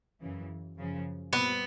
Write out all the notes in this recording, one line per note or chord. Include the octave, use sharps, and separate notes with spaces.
F#2 C#3 E3
F#2 C#3 F3
A#2 G3 B3 C4